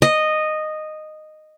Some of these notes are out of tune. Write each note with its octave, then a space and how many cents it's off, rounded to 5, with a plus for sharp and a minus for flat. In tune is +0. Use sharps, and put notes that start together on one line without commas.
D#5 -10